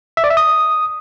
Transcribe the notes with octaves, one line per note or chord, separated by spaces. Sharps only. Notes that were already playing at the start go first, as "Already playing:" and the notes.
E5
D5
E5
D#6